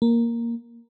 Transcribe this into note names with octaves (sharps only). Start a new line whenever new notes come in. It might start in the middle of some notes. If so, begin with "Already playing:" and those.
A#3